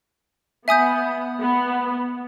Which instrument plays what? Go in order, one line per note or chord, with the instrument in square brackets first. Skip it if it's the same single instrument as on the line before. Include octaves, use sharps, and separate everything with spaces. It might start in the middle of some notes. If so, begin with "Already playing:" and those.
[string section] B3 [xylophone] E5 G#5 D#6 G6
[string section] B3